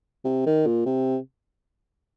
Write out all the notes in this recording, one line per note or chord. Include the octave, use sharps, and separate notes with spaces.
C3
D#3
A#2
C3